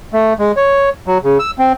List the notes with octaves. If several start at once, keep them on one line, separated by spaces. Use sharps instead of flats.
A3
G#3
C#5
F#3
C#3
E6
C4